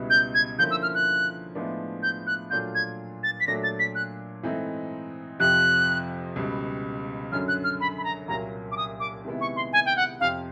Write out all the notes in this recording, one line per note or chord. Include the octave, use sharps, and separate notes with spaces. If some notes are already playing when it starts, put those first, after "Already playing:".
Already playing: C#2 B2 G3 B3 E4
G6
G#6
D3 F3 A#3 C#4 E4 G6
E6
F6
F#6
A2 F3 G#3 B3 D4
G6
F#6
A#2 F#3 A3 D4 F4 G6
G#6
A6
B6
A#2 F#3 A3 D4 A#6
A6
B6
F#6
G#2 E3 A3 C4 D#4
F2 C3 F3 F#6
C#2 B2 G3
F#2 D3 F#3 F6
F#6
F6
B5
B5
A#5
C2 A#2 F#3 A#3 A#5
D6
D#6
D6
C3 D#3 G#3 B3 E4
C#6
C6
G#5
G5
F#5
F2 C3 F3 F5